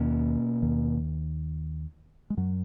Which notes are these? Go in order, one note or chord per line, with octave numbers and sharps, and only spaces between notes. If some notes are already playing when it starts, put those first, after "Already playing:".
Already playing: D#2 B2 D#3 A#3 C#4
D#2 D#3
G#3
F#2 F#3